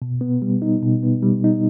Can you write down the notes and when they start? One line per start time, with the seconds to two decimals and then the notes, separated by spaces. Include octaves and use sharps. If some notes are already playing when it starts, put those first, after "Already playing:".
0.02 B2
0.21 B3
0.42 G3
0.62 D#4
0.82 B2
1.03 B3
1.23 G3
1.44 D#4